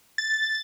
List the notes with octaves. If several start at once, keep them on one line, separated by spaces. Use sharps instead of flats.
A6